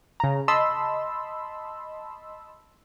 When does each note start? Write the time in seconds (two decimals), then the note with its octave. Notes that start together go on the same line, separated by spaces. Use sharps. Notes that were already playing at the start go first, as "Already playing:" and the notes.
0.20 C#3 A#5
0.48 D#5 A5 B5 C6 E6